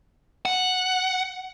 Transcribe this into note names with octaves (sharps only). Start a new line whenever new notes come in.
F#5